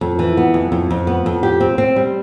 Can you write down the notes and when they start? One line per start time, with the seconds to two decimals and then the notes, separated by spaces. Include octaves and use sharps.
0.01 F2
0.19 E3
0.37 B3
0.54 F2
0.72 F2
0.90 F2
1.07 B3
1.26 F2
1.43 G4
1.60 C4
1.78 C4
1.96 G3